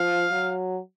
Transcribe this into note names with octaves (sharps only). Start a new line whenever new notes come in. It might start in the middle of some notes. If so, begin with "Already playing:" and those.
Already playing: F3 F5
F#3